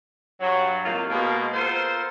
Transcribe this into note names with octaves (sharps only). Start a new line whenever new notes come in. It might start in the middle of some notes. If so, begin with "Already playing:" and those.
G2 F#3
A2 C3 D#3 A#3 D#4 F4
B2 G#3 A#3
B3 F4 A4 A#4 C5